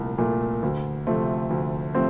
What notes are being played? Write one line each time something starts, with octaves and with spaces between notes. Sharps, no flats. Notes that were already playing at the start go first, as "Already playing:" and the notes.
Already playing: C2 A#2 A3
A#2 A3
D2
C3 F3 A3 C4
D2
C3 F3 A3 C4